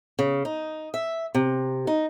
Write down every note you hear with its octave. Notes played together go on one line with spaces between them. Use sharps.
C#3
D#4
E5
C3
D#4